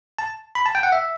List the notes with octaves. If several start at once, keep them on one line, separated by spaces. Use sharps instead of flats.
A5
B5
A5
G5
F#5
E5